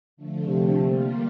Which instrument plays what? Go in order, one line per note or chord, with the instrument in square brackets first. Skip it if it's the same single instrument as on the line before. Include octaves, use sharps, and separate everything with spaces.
[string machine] D3 F3 A3
[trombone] C3
[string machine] G3 A#3 F4